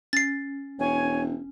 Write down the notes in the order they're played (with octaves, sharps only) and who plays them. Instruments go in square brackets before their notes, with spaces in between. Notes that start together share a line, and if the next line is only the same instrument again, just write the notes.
[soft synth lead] C#4 [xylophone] A6 C7
[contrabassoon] E1 [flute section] C#5 G#5